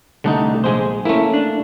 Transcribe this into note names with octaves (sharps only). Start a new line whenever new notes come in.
C2 D3 A3 D4 D#4
A#1 G#3 G#4 C5
A3 A#3 C#4 E4
D4